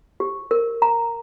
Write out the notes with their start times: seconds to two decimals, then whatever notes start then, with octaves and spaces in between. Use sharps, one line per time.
0.20 G4
0.51 A#4
0.82 A#5